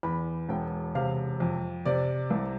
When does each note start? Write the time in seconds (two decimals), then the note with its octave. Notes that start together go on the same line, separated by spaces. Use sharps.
0.03 E2 B5
0.49 E1 G5
0.95 C3 F5
1.40 F2
1.85 C3 D5
2.30 C2